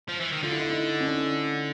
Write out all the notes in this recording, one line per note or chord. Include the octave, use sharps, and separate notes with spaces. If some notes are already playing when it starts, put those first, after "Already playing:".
F3
E3
D#3
D3 F4
E4
D#4
E4
C#4
D4